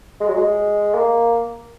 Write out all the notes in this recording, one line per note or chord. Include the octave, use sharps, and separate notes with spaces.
G#3
F#3
G#3
A#3